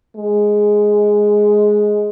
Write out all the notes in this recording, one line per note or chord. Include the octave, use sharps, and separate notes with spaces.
G#3